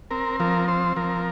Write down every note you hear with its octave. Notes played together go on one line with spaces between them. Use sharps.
C4 A#4
F3 A#4
C4 C5
F3 A#4